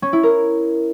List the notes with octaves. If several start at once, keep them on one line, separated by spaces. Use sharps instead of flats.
C#4
E4
A#4